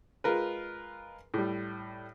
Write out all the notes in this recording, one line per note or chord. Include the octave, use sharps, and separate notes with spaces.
G#3 F4 A#4 B4
A2 G3